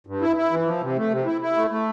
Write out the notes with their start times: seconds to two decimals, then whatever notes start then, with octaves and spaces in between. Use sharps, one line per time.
0.07 G2
0.21 E4
0.37 E4
0.51 E3
0.66 F3
0.81 C3
0.97 A3
1.11 C3
1.26 E4
1.42 E4
1.56 A3
1.70 A3